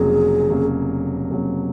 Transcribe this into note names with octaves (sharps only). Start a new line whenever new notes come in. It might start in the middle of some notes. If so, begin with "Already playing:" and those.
Already playing: F1 F2 C#3 F#3 A#3 G#4
F1 F2 C#3 F#3 A#3
F1 F2 C#3 F#3 A#3